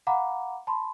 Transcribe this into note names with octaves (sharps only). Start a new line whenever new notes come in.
F5 F#5 A#5 B5 D6
A5 B5 C6